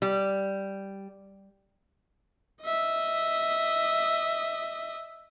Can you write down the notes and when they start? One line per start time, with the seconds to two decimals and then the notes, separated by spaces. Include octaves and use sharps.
0.02 G3
2.62 D#5 E5